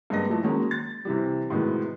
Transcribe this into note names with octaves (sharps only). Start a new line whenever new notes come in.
G2 G#3 A#3 D#5 A#6
E3 F3 A3
D#3 F#3 G#3 A#3 C#4
A6
C3 E3 G3
A2 C3 D#3 F#3 G#3 B3